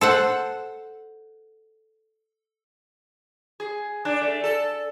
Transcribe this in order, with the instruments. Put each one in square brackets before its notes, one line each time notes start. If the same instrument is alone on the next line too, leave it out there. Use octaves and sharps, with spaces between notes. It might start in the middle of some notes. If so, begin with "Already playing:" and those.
[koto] A4 C5 F#5
[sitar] G#4
D4
A3
A4